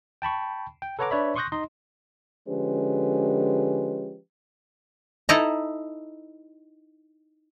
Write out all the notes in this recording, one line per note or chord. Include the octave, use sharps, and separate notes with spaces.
G5 A5 B5 C#6
G5
A4 B4 C#5 F#5 A#5 D6
D4 B4 C#5 D5 E5 B5
C6 C#6 D#6 F#6 G6 A#6
D#4 D#5 C6
D3 F3 G#3 C#4 G4 B4
D#4 E4 A4 D#5 A#5